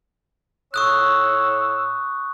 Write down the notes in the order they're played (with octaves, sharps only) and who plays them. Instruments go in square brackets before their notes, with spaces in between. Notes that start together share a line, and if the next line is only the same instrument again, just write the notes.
[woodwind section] A2 C#5 E6 [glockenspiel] C#6 D#6 F#6